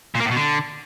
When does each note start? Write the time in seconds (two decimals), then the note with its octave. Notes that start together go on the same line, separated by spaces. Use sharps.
0.15 A#2
0.20 A#3
0.25 A2
0.31 B2
0.36 D3